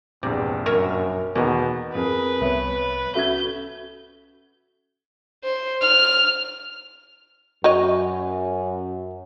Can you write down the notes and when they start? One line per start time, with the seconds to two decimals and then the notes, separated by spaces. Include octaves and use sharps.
0.23 A#1 E2 G2 C3 D6
0.66 F#2 A#4 C#5 E5
1.35 E2 B2 D#3 A#3
1.95 F2 G#4 A#4 B4
2.41 C2 B3 C#5 E5
3.15 C#4 F#4 A4 E5 G6 G#6
5.44 C5
5.81 F6
7.64 F#2 F#4 C#5 D#5